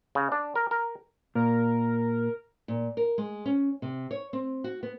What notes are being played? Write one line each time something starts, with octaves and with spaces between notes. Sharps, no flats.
C#3
D4
A#4
A#4
A#2 A#4
A#2
A#4
G#3
C#4
C3
C#5
C4
F#4
B3